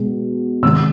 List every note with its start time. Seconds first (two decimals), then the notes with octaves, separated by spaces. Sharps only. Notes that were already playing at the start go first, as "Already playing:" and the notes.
Already playing: B2 G#3
0.62 C3 D#3 G#3 E6